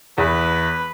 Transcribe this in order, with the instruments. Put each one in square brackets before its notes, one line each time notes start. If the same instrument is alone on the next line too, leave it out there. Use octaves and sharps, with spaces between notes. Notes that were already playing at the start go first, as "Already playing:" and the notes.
[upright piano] E2 [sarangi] B4